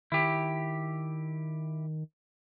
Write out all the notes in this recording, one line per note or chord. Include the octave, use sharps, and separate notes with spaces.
D#3 E4 G4